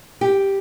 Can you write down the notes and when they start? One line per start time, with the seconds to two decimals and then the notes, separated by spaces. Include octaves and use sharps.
0.21 G4